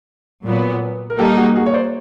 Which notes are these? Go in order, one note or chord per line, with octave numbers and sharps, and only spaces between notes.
A#2 F#3 B3
A#4
G3 A#3 D#4 G4 A4
F#4 G#4
F#4 G#4
C#5
C5 D5